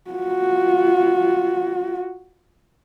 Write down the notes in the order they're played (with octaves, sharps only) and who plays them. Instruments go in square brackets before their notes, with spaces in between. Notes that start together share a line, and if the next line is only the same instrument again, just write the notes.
[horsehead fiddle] F4 F#4